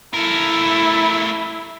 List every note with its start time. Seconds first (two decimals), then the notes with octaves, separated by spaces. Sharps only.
0.14 A3 E4 A#4